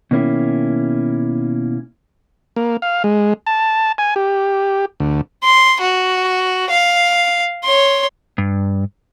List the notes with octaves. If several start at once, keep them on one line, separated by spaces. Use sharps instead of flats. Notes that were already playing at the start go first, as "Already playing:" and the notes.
B2 D#3 A#3 C#4 E4
A#3
F5
G#3
A5
G#5
G4
D2
C6
F#4
F5
C#5 C6
G2